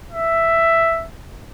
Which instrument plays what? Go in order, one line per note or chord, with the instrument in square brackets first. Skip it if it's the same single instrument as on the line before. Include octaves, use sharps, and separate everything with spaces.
[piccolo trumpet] E5